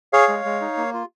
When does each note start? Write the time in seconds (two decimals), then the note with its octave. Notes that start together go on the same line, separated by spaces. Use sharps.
0.13 G#4 C#5 F5
0.28 G#3
0.45 G#3
0.61 D#4
0.77 A#3
0.94 F4